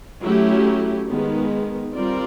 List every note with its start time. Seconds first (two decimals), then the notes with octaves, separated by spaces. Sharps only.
0.22 F#3 A3 C#4 E4 G4
1.09 D#3 G#3 B3
1.95 G3 C4 F4 A#4 D5